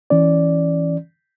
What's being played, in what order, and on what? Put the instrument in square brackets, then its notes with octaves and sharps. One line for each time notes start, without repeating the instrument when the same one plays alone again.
[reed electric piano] E3 C#4 D5